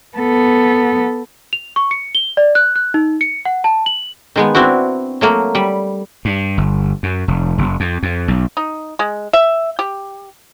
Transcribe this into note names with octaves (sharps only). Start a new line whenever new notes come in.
B3 A4
F7
C#6
C#7
G7
D5
F#6
F#6
D#4
C#7
F#5
A5
F#7
D#3 G#3 B3
C4 D4 E4 F#4
F#3 A3 A#3
G3 B5
G2
G1
F#2
F1
F#1
F2
F2
B1
D#4
G#3
E5
G4